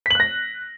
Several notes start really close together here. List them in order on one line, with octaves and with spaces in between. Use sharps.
B6 F#7 F#6 A#6